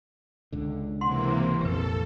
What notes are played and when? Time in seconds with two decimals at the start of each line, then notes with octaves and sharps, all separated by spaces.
0.52 C#2 D3
1.01 C3 E3 A#3 F#5 C6
1.61 A#1 F2 G4 A4 B4